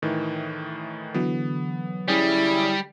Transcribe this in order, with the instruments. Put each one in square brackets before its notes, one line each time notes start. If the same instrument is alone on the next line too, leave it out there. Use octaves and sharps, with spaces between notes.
[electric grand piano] A2 D#3 E3
[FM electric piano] D3 E3 F#3 [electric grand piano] B3
[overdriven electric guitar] G3 [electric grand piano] C#4 G#4 [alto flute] E4